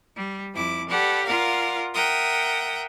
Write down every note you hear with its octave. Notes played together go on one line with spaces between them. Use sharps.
G3
F2 E4 D6
G4 A4 B4 D5 F#5
F4 A#4 D5 F5 F#5
A#4 E5 F#5 G5 D#6